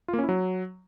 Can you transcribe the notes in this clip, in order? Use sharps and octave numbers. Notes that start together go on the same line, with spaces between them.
F4
A#3
C#4
E4
F#3